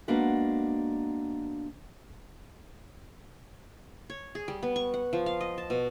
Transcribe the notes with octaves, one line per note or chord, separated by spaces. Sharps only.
G#3 A#3 B3 D4 F#4
C#5
G#4
G3
B3
C#6
F#5
F3
F5
D#5
A5
B2